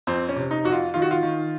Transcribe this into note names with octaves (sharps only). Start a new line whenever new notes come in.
F2 C4
C#4
C3
D#4
F2 F#4
F4
D#3 F4
F#4
F4
D#3